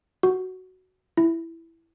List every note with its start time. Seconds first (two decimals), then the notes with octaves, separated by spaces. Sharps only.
0.23 F#4
1.17 E4